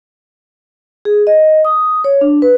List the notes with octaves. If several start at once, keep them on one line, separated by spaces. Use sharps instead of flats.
G#4
D#5
D#6
C#5
D4
B4